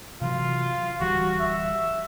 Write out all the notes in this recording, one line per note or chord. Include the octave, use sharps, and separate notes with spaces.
C3 E3 F#3 F4
D1 E3 G3 F#4
E5